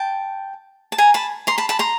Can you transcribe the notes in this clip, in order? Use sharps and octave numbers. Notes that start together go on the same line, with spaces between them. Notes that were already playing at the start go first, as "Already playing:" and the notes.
Already playing: G5 A5
A5
G#5 A#5
A5 B5
A#5 C6
A5 B5
A5 B5
A#5 C6